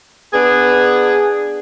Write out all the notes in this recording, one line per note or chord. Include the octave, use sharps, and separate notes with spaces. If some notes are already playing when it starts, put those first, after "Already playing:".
B3 D4 G#4